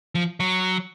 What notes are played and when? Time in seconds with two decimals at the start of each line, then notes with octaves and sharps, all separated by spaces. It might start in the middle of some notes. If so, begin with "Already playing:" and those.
0.15 F3
0.40 F#3